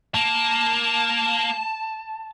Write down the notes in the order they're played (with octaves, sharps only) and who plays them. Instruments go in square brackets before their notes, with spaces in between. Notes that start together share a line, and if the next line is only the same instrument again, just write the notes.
[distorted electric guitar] A#3 [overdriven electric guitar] A5